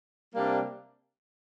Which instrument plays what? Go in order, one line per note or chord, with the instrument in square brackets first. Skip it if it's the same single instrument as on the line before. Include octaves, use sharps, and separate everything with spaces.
[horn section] C3 G3 A#3 D4